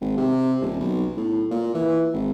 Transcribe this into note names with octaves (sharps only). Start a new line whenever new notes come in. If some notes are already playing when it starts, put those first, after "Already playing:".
G#1
C3
D#1
B1
A2
A#2
E3
G#1